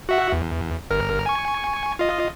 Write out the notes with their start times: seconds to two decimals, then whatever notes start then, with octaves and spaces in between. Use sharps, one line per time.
0.09 F#4 E5 F#5
0.32 E2
0.91 G1 A#4 F6
1.26 G#5 C#6
1.99 F4 D#5